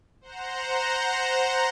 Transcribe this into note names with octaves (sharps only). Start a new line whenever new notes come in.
C5 F#5 A#5